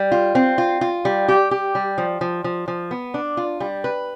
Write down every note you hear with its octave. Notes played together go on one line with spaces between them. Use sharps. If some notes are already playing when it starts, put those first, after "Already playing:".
Already playing: G3
F4
C4
F4
F4
G3
G4
G4
G3
F3
F3
F3
F3
B3
D4
F4
G3
B4